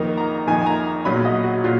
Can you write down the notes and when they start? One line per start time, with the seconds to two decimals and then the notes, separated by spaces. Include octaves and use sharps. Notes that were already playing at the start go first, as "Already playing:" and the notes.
Already playing: F2 D#3 A#3 D#4
0.17 A#5
0.47 F2 D#3 A#3 D#4 G#5
0.62 G#5
0.66 A#5
1.05 B1 A#2 F#3 C#4 B5
1.25 D#5
1.44 F#4
1.64 A#2 F#3 F4